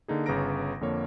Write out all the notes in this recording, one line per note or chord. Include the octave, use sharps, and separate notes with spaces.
D3 A#3 D#4 G#4
G1 C#3 B4 A#5 A#6 D7
F2 D3 A#3 C#5